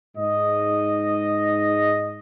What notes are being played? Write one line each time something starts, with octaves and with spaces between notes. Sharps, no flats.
G#2 D#5